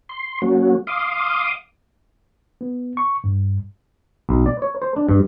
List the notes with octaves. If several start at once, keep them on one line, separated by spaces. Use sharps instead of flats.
C6
F#3 A#3 C#4 F#4
F5 C6 D6 D#6
B3
C#6
G2
B1
D5
C#5
C5
D4
G2